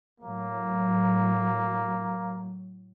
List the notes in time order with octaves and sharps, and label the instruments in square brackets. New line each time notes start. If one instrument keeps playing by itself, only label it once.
[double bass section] A2 F#3 [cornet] A#3